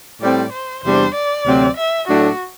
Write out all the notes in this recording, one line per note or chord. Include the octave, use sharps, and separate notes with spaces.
A2 G3 C4 D5
C5
E2 C3 G3 D4 C5
D5
D2 C3 F#3 C4
E5
A2 F#3 A3 D4 F#4